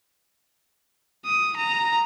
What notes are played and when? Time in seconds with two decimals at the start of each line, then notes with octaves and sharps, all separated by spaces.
1.25 D#6
1.57 A#5